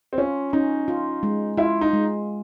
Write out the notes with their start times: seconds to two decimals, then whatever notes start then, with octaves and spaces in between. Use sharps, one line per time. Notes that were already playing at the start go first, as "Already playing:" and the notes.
0.13 C4
0.18 C#4 F4
0.53 C#4 D#4
0.88 F4
1.23 G#3
1.57 E4 F4
1.81 D#4
1.93 G#3